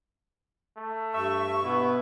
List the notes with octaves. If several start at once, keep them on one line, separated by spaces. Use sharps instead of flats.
A3
G2 E5 C#6
B2 B3 E4